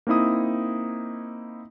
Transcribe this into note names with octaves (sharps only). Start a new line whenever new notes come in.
A#3 C4 D#4 E4 D#6